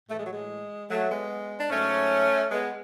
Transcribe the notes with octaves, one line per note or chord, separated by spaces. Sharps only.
A2 E3 G#3 A3
F#3
G#3
F#3 A3
G#3 B3
D4
G#2 F#3 A3 C#4
G#3 B3